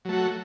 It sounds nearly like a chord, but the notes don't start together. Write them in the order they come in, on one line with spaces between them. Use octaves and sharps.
F#3 A3 F#4